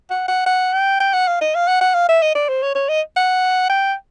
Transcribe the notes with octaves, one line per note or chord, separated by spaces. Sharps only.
F#5
F#5
F#5
G5
G5
F#5
F5
D#5
F5
F#5
F#5
F5
E5
D#5
D5
C5
C#5
C#5
D#5
F#5
G5